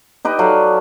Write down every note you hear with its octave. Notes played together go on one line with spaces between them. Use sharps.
D#4 G4 B4 D#5
F#3 A4 D5 F5